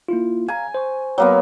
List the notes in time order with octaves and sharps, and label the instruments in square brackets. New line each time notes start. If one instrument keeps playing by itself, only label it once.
[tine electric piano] A#3 E4 F4
[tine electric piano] F5 A#5 [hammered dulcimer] G#5
[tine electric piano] C5 C#6
[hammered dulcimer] F#3 A#3 B3